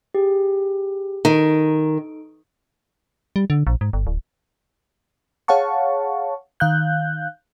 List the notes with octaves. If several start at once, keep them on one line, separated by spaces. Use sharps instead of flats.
G4 G#4
D#3 D#4 A4 D7
G3
D3
A#1
G#2
G1
D1
G#4 C#5 F5 F#5 A5 C#6
D#3 F5 F#6 G6